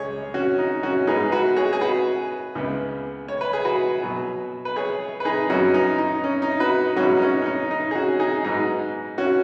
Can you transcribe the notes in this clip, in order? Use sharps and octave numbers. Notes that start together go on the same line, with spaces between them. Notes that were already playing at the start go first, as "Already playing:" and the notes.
Already playing: C#2 G#3 G#4 C#5
C#4 F#4
D#4
C#4 F#4
G#2 G#3 B3 D#4 G#4
F#4 B4
G#4 C#5
G#4
F#4 B4
C#2 C#3 B3
C#5
B4
G#4
F#4 B4
B2 F#3 B3
B4
G#4 C#5
B4
D#4 G#4
F#2 F#3 B3 C#4 F#4
D#4
D#4
C#4
D#4
F#4 B4
D#4
G#2 F#3 B3 C#4 F#4
D#4
C#4
C#4
D#4
D#4
G#4
C#4 F#4
D#4 G#4
G#2 F#3 B3 D#4
C#4 F#4